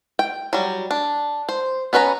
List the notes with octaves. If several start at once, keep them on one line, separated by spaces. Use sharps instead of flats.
G5
F#3 G3
D4
C5
B3 C#4 B4 G5 A#5